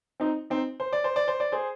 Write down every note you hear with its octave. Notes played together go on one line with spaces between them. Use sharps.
C4 D#4
C4 D#4
C5
D5
C5
D5
C5
D5
G#4 C5